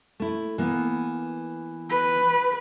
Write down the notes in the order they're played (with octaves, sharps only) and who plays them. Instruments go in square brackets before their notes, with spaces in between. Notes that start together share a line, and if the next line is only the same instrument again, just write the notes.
[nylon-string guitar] A3 E4
E3 A#3 B3
[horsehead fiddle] B4